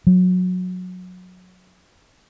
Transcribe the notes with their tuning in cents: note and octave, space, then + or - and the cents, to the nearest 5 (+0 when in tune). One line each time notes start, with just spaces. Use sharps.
F#3 -20